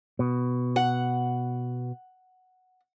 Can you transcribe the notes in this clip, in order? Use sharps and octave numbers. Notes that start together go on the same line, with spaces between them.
B2
F#5